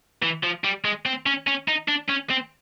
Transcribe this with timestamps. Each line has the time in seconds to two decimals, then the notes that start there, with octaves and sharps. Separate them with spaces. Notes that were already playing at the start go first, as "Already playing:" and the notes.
0.22 E3
0.43 F3
0.64 G3
0.85 G#3
1.06 C4
1.26 C#4
1.47 C#4
1.68 D#4
1.88 D4
2.10 C#4
2.30 C4